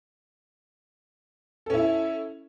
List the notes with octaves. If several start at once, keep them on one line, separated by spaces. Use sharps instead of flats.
C#4 E4 A4